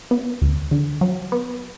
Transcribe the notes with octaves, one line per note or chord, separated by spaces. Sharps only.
B3
D2
D3
F#3
B3